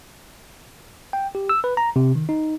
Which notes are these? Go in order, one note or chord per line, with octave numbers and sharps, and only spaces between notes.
G5
G4
E6
B4
A#5
C3
D#3
D#4